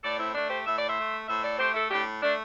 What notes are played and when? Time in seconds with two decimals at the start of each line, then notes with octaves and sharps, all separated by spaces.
0.03 A2 A4 D5
0.19 C4 E4
0.34 A3 D4
0.50 G4 C5
0.65 A2 E5
0.77 D5
0.88 C5 E5
0.97 A3
1.28 A2 C5 E5
1.44 A4 D5
1.59 A3 G4 C5
1.74 E4 A4
1.90 A2 D4 G4
2.22 A3 D4